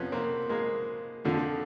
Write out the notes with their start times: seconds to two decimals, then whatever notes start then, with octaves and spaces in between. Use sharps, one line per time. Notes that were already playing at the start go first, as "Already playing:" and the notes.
Already playing: F2 C3 F3 B3 C#4
0.12 A#3 C4
0.49 G#3 A#3
1.25 F2 D3 F3